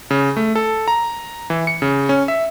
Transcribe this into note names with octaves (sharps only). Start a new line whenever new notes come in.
C#3
A3
A4
A#5
E3
C#7
C#3
C#4
E5